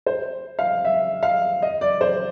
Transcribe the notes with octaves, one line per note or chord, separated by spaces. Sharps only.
C5
F5
E5
F5
D#5
D5
C5